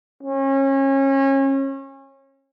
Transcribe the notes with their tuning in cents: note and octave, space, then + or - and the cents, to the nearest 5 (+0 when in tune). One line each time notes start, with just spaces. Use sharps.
C#4 -30